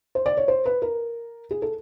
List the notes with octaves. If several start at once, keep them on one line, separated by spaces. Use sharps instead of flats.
C5
D5
C#5
C5
B4
A#4
G#4
A4